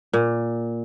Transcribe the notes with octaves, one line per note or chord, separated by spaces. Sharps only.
A#2